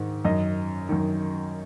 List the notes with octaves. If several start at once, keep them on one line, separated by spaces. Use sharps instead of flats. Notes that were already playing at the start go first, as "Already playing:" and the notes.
Already playing: G#2 D#3
F#2 D#3 D#5
F#2 D#3